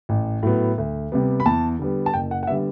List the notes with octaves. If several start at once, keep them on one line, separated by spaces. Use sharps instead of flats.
A1
A2 F#3 B3
D2
C3 G3 B3
B5
E2 A5
D3 G3 B3
A5
F#1 G5
F#5
F#5
D3 G3 B3 E5